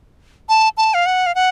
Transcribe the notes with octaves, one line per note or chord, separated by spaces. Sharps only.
A5
A5
F5
F#5
F5
F#5